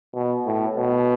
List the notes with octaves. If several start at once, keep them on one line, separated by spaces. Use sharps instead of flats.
B2
A2
B2